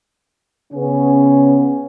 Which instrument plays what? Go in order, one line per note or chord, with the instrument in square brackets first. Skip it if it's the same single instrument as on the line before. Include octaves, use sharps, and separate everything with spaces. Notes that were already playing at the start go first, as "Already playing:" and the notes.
[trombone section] C#3 B3 C#4